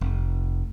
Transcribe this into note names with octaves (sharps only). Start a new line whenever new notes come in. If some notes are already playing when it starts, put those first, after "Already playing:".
F1